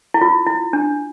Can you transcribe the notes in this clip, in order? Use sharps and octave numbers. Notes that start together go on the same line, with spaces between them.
E4
F4
E4
D4